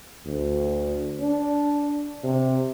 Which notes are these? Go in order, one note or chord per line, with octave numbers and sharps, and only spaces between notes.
D2
D4
C3